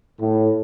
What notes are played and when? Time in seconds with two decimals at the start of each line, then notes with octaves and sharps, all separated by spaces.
0.21 A2